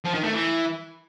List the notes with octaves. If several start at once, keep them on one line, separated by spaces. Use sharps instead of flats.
F3
D#3
A3
E3